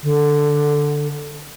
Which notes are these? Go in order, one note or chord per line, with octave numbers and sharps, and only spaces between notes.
D3